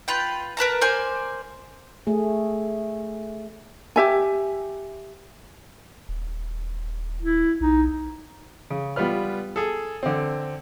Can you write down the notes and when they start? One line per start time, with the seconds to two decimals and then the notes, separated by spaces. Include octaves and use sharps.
0.08 F4 B4 G5
0.57 A#4 B4 A5 A#5
0.81 A#4 C5 D5 G#5
2.07 A3 G#4
3.96 G4 E5 G#5
6.09 D#1
7.22 E4
7.61 B1 D#4
8.70 C#3
8.96 G3 B3 F4 B4 F6
9.56 G#4 A4
10.03 D3 C4